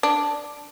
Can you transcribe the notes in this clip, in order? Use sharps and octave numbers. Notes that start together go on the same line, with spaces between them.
D4